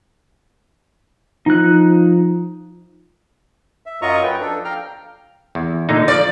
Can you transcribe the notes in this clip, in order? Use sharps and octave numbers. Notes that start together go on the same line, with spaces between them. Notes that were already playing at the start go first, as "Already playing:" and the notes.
F3 D#4 F#6
E5
F#2 F#3 F4 D#5 A#5 C#6
B4 G5
F3 D4 A4
F5 G5 A#5 F6
E2
A#2 D3 D#4
F3 D5